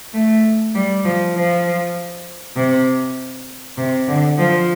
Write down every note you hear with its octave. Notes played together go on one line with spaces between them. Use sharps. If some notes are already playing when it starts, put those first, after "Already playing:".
A3
G3
F3
F3
C3
C3
D3
F3